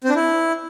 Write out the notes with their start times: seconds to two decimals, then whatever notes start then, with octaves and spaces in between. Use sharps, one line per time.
0.04 C4
0.10 D4
0.15 E4